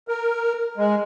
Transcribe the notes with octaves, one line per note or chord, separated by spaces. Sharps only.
A#4
G#3